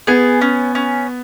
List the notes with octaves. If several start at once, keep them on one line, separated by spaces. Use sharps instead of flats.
B3 G#4
C#4
C#4